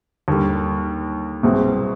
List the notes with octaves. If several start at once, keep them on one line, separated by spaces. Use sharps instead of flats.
D#2 D3 G3
C2 B2 G#3 C4